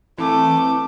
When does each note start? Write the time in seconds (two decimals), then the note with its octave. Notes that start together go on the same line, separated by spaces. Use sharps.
0.18 E3 A3 C4 D6